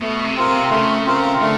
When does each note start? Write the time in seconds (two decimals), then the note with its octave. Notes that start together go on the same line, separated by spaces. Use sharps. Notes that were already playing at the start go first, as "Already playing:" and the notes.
0.01 B2 A3
0.25 C3
0.36 C4 F4 A#4
0.48 C3
0.71 C#3 A3
1.06 C4 F4 A#4
1.41 D3 A3